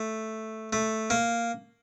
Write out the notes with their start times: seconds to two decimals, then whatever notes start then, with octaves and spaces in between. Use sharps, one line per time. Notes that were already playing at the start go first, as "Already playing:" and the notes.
Already playing: A3
0.73 A3
1.10 A#3